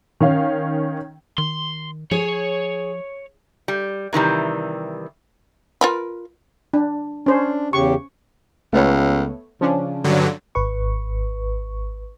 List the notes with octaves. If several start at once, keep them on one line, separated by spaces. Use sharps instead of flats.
D#3 C#4 F5
D#3 C6
F3 G#4 C#5
G3
C3 D#3 E3 G3
F4 A#4 B4
D4
C#4 D4 C5
E2 C#3 G4 C#6
C#2 A3 B3 C#5
C#3 F3 C#4 D4
G2 D3 F#3
G#1 B4 C#6